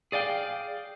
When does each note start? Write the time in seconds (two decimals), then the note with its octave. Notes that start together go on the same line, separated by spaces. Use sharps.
0.12 G#4 D5 F5 G5